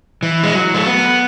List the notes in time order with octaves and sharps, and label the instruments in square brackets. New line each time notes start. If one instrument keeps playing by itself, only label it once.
[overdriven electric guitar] E3
G#3
F#3
A3
B3